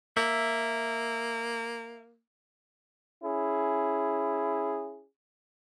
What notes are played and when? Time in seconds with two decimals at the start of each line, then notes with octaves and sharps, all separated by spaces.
0.17 A#3 E5
3.24 C#4 E4 G#4